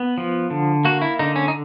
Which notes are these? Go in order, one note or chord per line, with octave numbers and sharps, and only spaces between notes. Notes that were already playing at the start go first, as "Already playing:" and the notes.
Already playing: B3
F3
D3
A#3 F#4
E4
D3 D#4
C#4
D#4